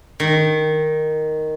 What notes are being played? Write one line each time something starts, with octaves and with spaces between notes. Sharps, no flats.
D#3